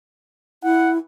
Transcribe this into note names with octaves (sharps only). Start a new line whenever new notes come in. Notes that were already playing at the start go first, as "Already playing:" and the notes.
E4 F#5